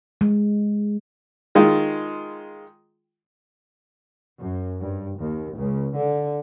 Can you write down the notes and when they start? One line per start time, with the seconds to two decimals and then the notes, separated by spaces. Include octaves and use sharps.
0.21 G#3
1.55 D#3 G#3 D#4 F4
4.38 F#2
4.80 G2
5.18 D#2
5.57 C#2
5.96 D3